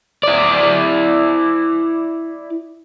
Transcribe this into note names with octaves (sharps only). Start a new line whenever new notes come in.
E4 D5